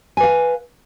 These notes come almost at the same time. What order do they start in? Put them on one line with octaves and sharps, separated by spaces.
G#5 B4 F5